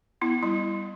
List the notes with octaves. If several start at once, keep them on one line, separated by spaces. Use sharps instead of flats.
B3 E4
G3 E4